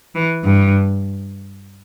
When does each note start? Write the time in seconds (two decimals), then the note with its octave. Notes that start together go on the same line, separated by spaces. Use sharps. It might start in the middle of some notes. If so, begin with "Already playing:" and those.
0.15 E3
0.44 G2